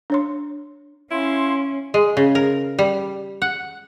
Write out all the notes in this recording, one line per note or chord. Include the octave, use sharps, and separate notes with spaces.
D4 C#5 C6
C#4 E4 F5 C6
G#3
C#3
A#4
G3
F#5